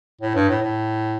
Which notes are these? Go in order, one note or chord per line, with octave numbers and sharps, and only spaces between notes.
A2
G2
A2
A2